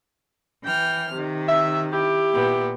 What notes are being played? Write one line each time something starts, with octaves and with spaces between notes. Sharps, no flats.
E3 G5 F6
C3 D#3
E5
E4 G4
A#2 B3